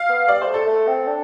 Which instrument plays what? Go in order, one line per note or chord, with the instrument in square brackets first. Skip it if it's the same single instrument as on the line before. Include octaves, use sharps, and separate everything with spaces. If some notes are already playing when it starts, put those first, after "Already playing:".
Already playing: [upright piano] F5
[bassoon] B3
[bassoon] G3 [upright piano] D5
[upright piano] C5
[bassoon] A3
[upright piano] A4
[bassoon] A3
C4
D4